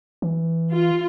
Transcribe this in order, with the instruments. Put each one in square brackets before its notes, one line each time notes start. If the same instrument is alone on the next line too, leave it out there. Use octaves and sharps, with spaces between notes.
[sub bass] E3
[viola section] F4